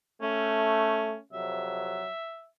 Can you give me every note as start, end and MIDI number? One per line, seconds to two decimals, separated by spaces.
0.22 1.16 57
0.22 1.22 61
1.33 2.07 41
1.33 2.07 48
1.33 2.07 54
1.33 2.47 76